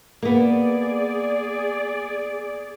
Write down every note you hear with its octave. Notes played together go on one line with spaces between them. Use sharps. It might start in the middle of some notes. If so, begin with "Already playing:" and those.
A#3 B3 G#4 D5